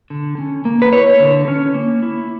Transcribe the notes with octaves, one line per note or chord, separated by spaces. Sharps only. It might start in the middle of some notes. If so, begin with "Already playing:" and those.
D3
C#4
A#3
B4
E4 C#5
D3
C#4
A#3
E4